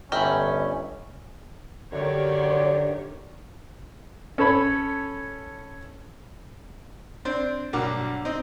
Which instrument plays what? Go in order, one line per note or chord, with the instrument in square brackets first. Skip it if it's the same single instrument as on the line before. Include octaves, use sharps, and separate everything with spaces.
[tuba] G1 [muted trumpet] C#4 [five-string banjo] G4 A#4 [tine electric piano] D#5 E5 B5
[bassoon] F#2 [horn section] D3 D5 [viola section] D#3 G4 C#5
[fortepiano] C#4 A4 C#5 B5
C4 D4 C5
B1 G2 A#3 F#4 D6
C4 D#4